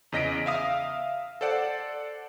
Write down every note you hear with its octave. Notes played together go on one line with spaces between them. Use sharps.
E2 C#3 D#5 A#6 B6 D7
E5 F5 D#6
A4 C5 D5 F#5